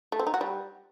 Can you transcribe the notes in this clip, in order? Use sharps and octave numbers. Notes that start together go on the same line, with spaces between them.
A3
C4
D#4
F#4
G3